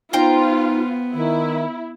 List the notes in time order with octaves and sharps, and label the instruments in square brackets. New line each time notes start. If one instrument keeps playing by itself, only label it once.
[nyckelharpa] B3 [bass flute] D#4 [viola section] F4 [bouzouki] C5 G5 A#5
[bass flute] D#3 [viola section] E4